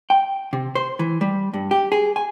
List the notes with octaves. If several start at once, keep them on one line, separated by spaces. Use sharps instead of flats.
G5
C3
C5
E3
G3
G2
G4
G#4
G#5